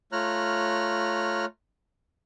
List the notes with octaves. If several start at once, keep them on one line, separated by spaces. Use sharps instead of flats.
A3 F4 C#5 A#5 F6 F#6